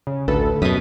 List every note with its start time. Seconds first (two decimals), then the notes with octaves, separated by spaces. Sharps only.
0.07 C#3
0.28 A1 D2 A4 B4
0.62 F#2 B2 D#6 B6 D#7